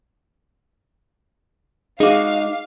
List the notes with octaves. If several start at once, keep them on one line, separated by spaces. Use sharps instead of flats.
G#3 D#4 F#4 G#4 F5 D6